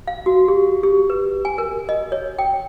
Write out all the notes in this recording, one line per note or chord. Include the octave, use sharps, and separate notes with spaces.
F5
F#4
G4
G4
B4
G#5
A#4
D#5
C#5
G5